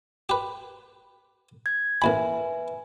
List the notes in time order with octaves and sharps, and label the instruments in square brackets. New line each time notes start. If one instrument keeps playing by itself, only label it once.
[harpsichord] G4 B4
[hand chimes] G#6
[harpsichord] A1 D#2 B5 [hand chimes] B4 E5 G#5